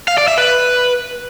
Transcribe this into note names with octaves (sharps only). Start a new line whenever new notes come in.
F5
D5
E5
B4